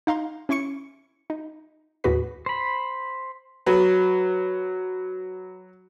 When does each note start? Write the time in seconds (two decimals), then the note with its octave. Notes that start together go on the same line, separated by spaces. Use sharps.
0.07 D#4 F5 A#5 C6
0.49 C#4 E4 C6 C#6 C#7
1.30 D#4
2.04 D#2 A2 F#4 G#4 B4 B6
2.46 C5 B5
3.66 F#3 B4